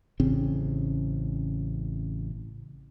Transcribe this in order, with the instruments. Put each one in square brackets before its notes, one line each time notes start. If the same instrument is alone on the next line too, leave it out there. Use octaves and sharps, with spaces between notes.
[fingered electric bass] A1 C#3 C4